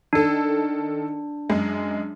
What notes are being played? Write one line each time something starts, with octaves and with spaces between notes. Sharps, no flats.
D#3 D4 A4
F#2 G#3